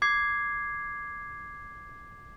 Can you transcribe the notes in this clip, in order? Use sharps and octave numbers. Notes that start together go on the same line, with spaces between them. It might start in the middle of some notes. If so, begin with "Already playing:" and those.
D6 G#6 C7